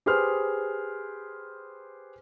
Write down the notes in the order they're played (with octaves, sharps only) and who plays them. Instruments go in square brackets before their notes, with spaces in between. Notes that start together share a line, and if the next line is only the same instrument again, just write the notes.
[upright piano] G4 G#4 B4 C5 F6